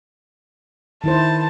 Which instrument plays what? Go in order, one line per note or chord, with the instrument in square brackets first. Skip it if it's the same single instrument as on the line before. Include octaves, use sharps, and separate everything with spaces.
[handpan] D#3 E4 C5 [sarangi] A5